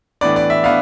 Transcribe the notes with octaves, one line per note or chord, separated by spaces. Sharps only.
A2 E3 B3 D4 D5
D5
E5
E3 B3 D4 F5